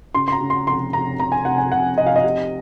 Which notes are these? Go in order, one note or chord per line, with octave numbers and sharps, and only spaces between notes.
C#3 C6
C6
A#5
C#3
C6
F1 C6
F1 A#5
F1 A#5
G#5
F1 F#5
G#5
F1 F#5
F1 D#5
F5
D#5
C3